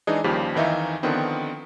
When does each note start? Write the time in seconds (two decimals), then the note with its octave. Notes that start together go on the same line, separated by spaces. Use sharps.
0.07 E3 G#3 D4 D#4 G#4
0.24 D#2 C#3 F3 G3 G4
0.55 F2 D#3 E3 D#4 E5 F5
1.03 D3 D#3 F3 B3 C4